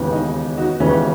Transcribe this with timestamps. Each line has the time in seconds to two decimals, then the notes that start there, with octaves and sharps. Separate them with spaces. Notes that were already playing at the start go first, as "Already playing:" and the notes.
Already playing: E1 D#2 C#3 E3 B3
0.12 D#4
0.57 D#4 F#4
0.80 E1 D#2 C#3 E3 B3 C#4 E4